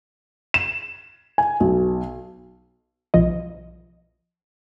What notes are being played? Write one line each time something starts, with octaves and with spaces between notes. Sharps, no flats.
E7
G#5
B1
B1 F3 D#5